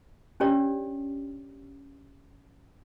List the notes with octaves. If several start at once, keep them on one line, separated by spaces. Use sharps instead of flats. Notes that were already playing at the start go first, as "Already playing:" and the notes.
C#4 D4 G4 C#5 D5